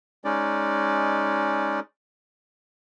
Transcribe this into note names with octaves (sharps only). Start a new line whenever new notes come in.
G#3 C#4 D#4 D5